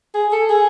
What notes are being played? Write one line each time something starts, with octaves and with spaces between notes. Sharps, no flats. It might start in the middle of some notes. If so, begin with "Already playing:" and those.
G#4
A4
G#4